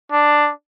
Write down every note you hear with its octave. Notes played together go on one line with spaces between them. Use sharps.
D4